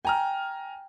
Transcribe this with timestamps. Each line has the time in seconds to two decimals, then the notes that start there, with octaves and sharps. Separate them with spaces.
0.05 G5 G#5 A#5 F6